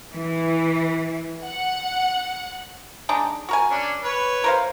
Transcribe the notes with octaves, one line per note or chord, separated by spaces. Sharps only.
E3
F#5
G#3 D4 D#4
F#4 A#4 G#5
C#4 D4
B4 C#5
A#4 C5 F5